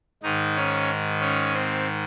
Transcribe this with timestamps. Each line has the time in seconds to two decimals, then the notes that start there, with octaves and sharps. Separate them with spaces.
0.23 G#2 D#3 D#4
0.56 C#4
1.21 C#4
1.54 C4